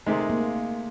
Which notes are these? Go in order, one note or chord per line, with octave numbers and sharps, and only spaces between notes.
C3 D#3 G#3 A3
A#3